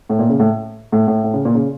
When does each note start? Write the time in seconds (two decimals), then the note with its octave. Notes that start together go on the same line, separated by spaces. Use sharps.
0.09 A2
0.19 A#2
0.29 C#3
0.40 A2
0.92 A2
1.08 A2
1.24 A2
1.34 C#3
1.45 A#2
1.55 C#3